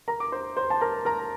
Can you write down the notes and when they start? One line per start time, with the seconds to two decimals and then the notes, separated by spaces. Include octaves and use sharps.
0.08 A#4 A#5
0.20 D6
0.32 C5 C6
0.56 C5 C6
0.70 A5
0.81 A#4 A#5
1.05 A#4 A#5